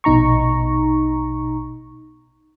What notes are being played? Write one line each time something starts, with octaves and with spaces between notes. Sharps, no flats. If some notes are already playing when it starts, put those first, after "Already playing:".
A#1 B2 D#4 A#5 C#6